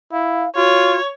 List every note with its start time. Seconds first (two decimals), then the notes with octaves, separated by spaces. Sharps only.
0.12 E4 F5
0.56 F4 F#4 C#5